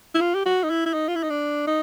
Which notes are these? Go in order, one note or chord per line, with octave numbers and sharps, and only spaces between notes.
E4
F4
G4
F#4
D#4
E4
E4
D#4
F4
E4
D#4
D4
D#4